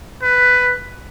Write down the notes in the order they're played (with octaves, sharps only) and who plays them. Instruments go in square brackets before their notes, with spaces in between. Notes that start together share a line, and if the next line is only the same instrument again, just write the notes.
[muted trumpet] B4